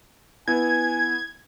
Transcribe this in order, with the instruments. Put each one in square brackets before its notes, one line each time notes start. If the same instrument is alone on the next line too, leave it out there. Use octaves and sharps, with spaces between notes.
[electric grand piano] B3 E4 [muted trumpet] G#5 [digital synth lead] G#6